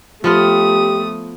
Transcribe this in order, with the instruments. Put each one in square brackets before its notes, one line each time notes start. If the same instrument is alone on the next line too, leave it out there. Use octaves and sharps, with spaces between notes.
[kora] F3 B3 F4 [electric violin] A3 D#6 [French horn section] G4